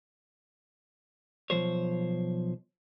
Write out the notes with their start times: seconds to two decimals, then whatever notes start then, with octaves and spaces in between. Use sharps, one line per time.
1.50 B1 A2 F3 C5 C#5